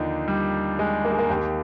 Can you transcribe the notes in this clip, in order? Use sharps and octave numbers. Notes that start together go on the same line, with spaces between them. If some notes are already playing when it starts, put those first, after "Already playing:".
Already playing: D#2 D3 F3 D4 D#4
G3
G#3
A#3
G#3
A#3
D#2 D#3 G4